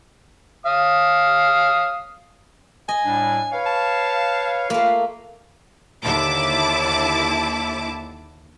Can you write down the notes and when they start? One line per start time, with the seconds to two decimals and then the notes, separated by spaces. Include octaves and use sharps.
0.66 F5 D#6
2.89 D#5 G#5
3.05 A2 G3 D4
3.52 B4 C#5 F5
3.66 A5
4.70 A3 A#3 F4 B4 F5
6.03 D#2 D3 E4 A5 D6